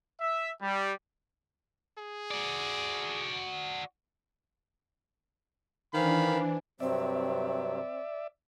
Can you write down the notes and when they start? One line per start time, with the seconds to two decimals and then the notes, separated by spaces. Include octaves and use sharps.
0.21 E5
0.62 G3
1.98 G#4
2.31 F#4 D5
5.94 D#3 E3 D4 B4 C5 F5 G#5 B5
6.80 G2 C3 F#3 C4 D5 E5